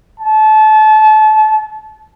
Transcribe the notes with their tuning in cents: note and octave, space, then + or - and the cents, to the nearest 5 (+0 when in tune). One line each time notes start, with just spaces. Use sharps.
A5 -30